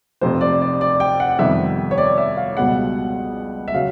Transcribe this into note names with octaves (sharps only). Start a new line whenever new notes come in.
F1 F2 C3 C5
D5
D5
D5
G5
F#5
F2 C3 D#3 G3 B3 E5
C#5
D5
E5
F5
C#2 B2 G3 B3 F#5
E5
C#3 F#3 F5